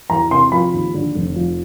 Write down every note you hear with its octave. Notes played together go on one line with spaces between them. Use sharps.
E2 A#5
C3 C6
F3 B5
D#2
D3
F1
F3